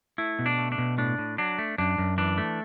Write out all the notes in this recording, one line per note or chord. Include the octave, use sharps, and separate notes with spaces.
A3 E4
B2
D4
A3
D4
B2
A2 D4
A2
F#3 D4
A3
F#2 D4
F#2
E3 D4
A3